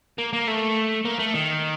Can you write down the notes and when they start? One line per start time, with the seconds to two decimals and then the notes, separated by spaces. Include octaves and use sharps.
0.18 A#3
0.33 A#3
0.48 A3
1.05 A#3
1.19 A3
1.34 D#3